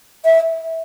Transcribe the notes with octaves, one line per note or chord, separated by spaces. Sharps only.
E5